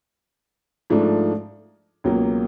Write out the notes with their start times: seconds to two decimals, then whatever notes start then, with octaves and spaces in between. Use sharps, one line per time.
0.90 G#2 F3 A3 D4
2.04 C#2 B2 F#3 A#3